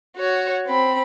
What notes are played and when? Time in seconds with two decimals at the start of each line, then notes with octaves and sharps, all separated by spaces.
0.16 F#4 C#5
0.67 C4 B5